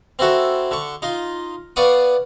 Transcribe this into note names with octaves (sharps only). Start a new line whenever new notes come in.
C4 E4 F#4 A4
D3 C#6
D#4 F4
B3 D5 F5 C#6 D#6